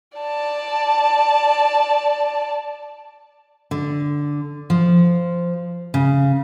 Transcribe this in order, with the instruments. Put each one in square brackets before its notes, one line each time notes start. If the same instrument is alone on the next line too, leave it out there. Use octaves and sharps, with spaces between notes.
[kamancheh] D5 A5
[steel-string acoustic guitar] D3
F3
C#3